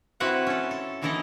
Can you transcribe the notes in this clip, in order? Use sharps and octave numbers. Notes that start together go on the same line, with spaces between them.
C4 E4 F#4 B4 E5 F#5
C#4 A4
A4
A#2 D#3 E3 E4 A4 D#5